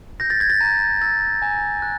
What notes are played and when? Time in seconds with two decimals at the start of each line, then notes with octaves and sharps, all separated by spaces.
0.20 G6 A#6
0.30 A6
0.40 G#6
0.50 A6
0.61 A#5
1.01 E6 A6
1.42 G#5
1.82 F#6